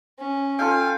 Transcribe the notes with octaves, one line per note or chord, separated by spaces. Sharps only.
C#4
F4 A4 F5 G5 G#5